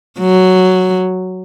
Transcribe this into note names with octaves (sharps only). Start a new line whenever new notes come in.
F#3